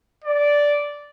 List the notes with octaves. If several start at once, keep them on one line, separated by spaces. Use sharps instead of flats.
D5